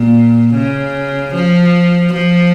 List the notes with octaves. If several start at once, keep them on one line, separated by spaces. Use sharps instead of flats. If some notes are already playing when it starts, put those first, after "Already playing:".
Already playing: A#2
C#3
F3
F3